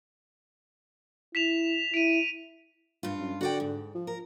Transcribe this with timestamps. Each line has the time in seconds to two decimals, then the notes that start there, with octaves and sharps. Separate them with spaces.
1.35 E4 B6 E7 F7
1.94 E4 D7 D#7
3.03 G2 F4
3.19 F#2
3.41 D3 F#4 D5 G5
3.60 G#2
3.95 F3
4.07 A#4